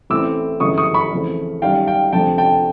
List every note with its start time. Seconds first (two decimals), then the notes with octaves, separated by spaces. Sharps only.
0.10 A1 A2 E3 A3 C4 D6 E6
0.60 G1 F#2 C#3 E3 A3 C#6 D#6
0.78 C#6 D#6
0.94 B5 C#6
1.12 F2 C#3 E3 A3
1.62 F#2 D#3 G3 F5 G5
1.87 F5 G5
2.12 F1 F2 D3 F3 A3 G5 A5
2.38 G5 A5